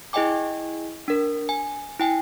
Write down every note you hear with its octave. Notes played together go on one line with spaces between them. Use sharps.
E4 G#4 D#5 G5 G#5 D6
D4 A#4
G#5
E4 G5 G#5